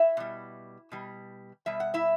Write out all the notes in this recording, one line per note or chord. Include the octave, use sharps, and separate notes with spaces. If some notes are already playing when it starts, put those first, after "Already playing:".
Already playing: E4 E5
B2 G3
B2 G3
B2 G3 E5
F#5
E4 E5